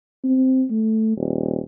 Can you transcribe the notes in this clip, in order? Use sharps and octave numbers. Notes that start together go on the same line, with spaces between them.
C4
A3
D#1